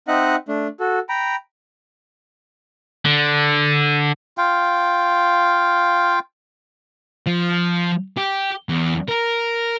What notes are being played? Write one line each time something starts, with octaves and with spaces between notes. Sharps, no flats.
C4 D#4 D#5 E5 F#5 F#6
A3 D4
F#4 A4
G5 A#5 B5
D3
F4 F5 G5
F3
G4
E2
A#4